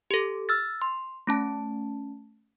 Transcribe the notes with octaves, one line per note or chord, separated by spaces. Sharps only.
G4 A4
E6 F6 A6
C6
A3 C#4 A5